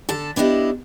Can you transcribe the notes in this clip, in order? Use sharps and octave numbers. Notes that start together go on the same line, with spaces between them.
D3 A4 A5
B3 D4 E4 G4 D#5